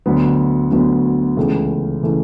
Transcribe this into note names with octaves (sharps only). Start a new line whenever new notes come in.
D2 D3 F#3 B3
D2 D3 F#3 B3
C#2 C#3 E3 A3
C#3 E3 A3